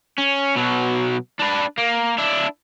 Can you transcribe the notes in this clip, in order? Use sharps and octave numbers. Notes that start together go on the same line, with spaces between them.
C#4
B2 F#3
D4 B4
A#3
D4 E4